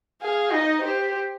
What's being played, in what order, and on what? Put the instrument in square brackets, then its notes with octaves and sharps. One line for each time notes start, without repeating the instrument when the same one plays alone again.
[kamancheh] G#4 [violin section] F5
[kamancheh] D#4 [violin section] D#5
[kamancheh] G4 [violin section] C5